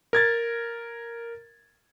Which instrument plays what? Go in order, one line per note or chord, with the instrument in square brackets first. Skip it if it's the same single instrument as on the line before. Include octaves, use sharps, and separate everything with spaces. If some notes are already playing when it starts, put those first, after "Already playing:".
[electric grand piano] A#4 G#6 A6